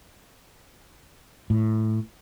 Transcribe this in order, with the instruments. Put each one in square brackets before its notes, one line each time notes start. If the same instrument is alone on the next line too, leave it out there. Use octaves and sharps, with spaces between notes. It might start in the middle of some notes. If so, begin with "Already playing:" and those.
[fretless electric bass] A2